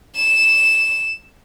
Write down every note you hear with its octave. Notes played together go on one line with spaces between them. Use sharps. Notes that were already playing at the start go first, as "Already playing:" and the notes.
E7